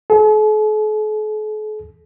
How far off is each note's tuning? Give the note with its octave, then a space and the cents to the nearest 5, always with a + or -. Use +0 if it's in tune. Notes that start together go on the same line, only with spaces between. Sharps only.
A4 -45